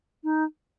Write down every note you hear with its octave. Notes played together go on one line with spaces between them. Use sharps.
D#4